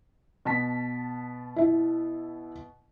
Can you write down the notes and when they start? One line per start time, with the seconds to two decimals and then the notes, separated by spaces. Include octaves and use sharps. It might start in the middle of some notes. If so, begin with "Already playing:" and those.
0.45 B2 A5 B6
1.56 E4 E5